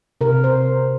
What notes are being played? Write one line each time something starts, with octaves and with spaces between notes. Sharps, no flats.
C3 A#4
C5